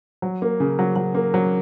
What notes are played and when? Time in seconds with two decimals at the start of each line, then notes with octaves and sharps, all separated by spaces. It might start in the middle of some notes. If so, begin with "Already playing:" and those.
0.22 F#3
0.42 A#3
0.60 C#3
0.79 F#3
0.96 F#3
1.15 A#3
1.34 F#3